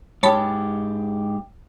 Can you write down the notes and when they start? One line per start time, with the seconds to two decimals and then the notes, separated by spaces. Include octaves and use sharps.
0.23 G#2 G4 C#5 A5 B5